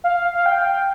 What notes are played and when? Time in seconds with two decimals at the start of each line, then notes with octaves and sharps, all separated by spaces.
0.04 F5
0.34 F5
0.46 G5